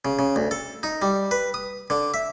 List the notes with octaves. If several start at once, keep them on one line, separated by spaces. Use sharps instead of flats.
C#3
C#3
D2
A4
D#4
G3
B4
D#6
D3
E5